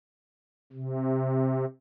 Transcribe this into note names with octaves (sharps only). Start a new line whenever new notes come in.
C3